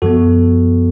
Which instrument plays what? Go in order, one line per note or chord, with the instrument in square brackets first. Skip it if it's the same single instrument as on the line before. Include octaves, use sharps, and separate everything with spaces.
[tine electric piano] F#2 F3 B3 F#4 A4